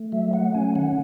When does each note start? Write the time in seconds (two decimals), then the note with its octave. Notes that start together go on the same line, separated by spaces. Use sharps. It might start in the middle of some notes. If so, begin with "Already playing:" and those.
Already playing: A3
0.12 F#3 E5
0.33 A3 F#5
0.54 C#4 G#5
0.76 D#3 F#5